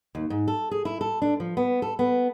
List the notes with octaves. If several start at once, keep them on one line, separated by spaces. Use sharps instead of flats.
D#2
G#2
A4
G#4
E4
A4
D4
F3
B3
A4
B3